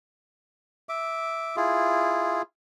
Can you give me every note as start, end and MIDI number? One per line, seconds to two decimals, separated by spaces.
0.89 1.56 76
0.89 1.56 86
1.56 2.42 64
1.56 2.42 65
1.56 2.42 68